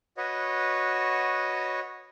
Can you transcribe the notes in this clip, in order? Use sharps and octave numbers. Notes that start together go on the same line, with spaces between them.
F#4 B4 C#5 D#5